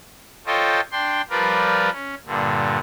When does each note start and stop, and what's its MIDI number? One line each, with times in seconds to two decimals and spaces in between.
0.46 0.80 65
0.46 0.80 69
0.46 0.80 72
0.46 0.80 73
0.46 0.80 75
0.46 0.80 79
0.92 1.21 62
0.92 1.21 79
0.92 1.21 84
1.30 1.90 53
1.30 1.90 55
1.30 1.90 65
1.30 1.90 70
1.30 1.90 71
1.30 1.90 74
1.92 2.15 61
2.26 2.79 43
2.26 2.79 46
2.26 2.79 50